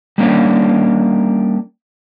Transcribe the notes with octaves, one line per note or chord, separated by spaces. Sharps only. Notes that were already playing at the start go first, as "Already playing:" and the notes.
G3 A#3 C#4 D4